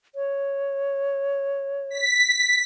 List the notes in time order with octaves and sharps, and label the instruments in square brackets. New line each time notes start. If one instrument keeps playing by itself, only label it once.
[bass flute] C#5
[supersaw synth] B6